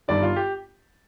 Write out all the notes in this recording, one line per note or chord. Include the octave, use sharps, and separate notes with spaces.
G1 G2 D#3 D5
F4
G4